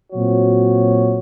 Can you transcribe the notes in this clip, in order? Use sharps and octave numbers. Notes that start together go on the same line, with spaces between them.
A#2 F#3 C4 F#4 C#5